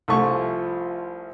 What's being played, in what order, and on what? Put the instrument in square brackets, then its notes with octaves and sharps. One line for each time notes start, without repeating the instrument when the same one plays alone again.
[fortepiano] C2 A3 C#6 [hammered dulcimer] F3 E4 G#5